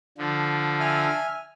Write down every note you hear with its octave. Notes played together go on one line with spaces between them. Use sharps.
D3 F3
E5 G#5 F6